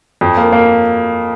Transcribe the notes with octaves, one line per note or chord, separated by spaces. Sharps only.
F2
A#3
A#3